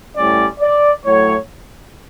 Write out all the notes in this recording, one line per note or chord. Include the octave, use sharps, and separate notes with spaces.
A2 G3 C#4 D5
D5
A2 F#3 A3 C#5